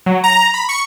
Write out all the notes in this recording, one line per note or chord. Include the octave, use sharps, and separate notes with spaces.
F#3
A#5
B5
C#6